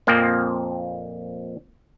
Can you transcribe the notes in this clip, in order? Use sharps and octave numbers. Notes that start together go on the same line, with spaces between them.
F2 A#2 F3 A#3 C4